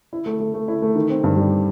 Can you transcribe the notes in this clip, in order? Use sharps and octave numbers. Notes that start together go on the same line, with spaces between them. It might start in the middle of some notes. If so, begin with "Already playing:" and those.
E4
A3
A3
A3
E4
A3
D#3
C4
G2
G3